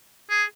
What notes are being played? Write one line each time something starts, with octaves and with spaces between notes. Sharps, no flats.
G#4